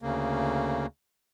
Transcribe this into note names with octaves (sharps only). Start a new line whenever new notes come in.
D2 C#3 A#3